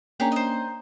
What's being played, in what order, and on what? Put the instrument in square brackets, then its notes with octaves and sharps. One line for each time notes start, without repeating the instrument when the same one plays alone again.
[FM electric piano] A#3 C#4 D4 [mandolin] G4 G#4 C#5 [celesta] G5 A#5
[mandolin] C5 D#5